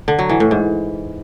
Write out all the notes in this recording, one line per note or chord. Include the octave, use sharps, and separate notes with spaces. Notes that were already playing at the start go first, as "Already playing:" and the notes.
D3
F#3
E3
A2
G#2